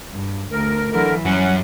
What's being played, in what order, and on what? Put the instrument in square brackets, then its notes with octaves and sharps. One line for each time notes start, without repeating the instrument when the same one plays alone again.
[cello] G2
[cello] D2 [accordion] A#4
[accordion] D3 A#4 [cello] E3 F#3
[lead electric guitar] F#2 [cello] G3 [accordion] C#4 F#5